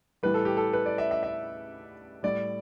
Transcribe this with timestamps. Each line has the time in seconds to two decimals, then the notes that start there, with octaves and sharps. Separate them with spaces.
0.23 A2 E3 G3 B4
0.34 A4
0.45 G4
0.57 A4
0.73 B4
0.86 D5
0.98 E5
1.11 E5
1.23 E5
2.23 A2 G3 D5